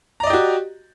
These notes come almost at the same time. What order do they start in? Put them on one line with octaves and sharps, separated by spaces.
A#5 D5 D#5 G4 F#4